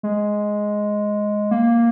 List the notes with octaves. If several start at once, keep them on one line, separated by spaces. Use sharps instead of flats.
G#3
A#3